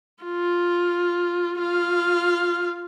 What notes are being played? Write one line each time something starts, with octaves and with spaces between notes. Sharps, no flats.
F4
F4 F5